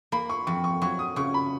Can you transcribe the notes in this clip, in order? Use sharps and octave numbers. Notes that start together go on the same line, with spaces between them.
A#3 B5
C#6
F2 C#6
C#6
F#3 C#6
D#6
C#3 C#6
B5